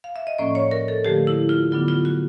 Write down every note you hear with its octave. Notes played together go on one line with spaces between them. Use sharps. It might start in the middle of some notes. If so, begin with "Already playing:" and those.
F5
E5
D#5
A2 F3 A#3 C#4 D5
C#5
A#4
A4
D3 F3 A3 G4
E4
F4
D3 F#3 B3 D4 F4
F4
F#4